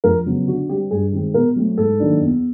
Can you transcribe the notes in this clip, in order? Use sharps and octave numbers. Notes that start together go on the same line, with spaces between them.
F2 A#4
C#3 F#3 B3
D3 F#4
G3 C4 G4
G2 G#4
D#3 G#3 C4
B2 A#4
F#3 A3 C4
G#2 A4
D#3 F#3 A#3 D4
E2